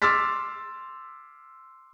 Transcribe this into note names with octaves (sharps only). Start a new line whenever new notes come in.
C6 D6 E6 F6 A6 B6